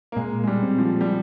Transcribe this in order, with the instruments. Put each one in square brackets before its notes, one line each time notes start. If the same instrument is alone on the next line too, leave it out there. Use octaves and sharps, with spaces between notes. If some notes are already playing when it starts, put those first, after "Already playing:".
[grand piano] A#3
[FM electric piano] A#2 [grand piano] G#3
[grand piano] G#3
G3
[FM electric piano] C4
[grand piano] F3
G3